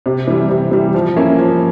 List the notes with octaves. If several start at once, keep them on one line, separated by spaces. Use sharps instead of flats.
C3
E3 G3
C3
E3 G3
F3
A#3 C#4 E4
F3